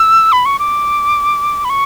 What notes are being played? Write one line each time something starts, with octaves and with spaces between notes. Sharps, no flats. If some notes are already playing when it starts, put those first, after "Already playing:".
Already playing: E6
B5
C#6
D6
B5
C#6